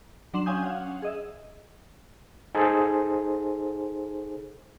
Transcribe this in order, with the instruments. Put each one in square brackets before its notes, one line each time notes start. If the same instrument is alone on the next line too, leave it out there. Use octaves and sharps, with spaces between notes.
[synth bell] F#3 D4 C6 E7 F#7
C#4 F5 G5 G#5 D#6 G6
F5 F#5
G#4 D#5 E5
[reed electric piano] D#4 G#4 A4 C5